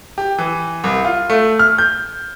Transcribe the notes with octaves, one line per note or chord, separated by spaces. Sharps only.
G4
E3
C2
F4
A3
F6
G6